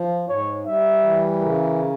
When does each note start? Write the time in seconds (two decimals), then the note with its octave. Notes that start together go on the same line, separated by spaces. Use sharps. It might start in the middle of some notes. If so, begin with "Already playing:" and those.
Already playing: F3
0.29 G#2 C#5
0.66 G3 E5
1.03 E3
1.41 C#3 A#4